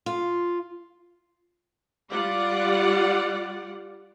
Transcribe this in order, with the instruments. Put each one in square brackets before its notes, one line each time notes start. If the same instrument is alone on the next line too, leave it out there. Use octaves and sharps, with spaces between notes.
[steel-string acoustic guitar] F4
[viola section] G3 F4 D5 F#5